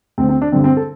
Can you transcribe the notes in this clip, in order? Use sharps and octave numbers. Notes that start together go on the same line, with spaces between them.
D2 D3 C4
C4
D4
G2 D3 C4
C4
A4